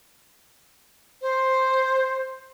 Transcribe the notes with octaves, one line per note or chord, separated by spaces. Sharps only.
C5